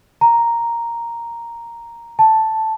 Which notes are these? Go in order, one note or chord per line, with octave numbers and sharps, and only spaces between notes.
A#5
A5